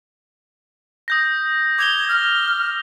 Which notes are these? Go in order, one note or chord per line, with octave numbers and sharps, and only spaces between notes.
D#6 G6 A#6
D6 G#6 F7 G7
F6